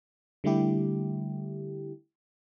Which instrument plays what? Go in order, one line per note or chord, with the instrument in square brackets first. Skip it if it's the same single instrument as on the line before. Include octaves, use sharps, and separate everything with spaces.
[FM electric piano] D3 G3 A3 E4 G4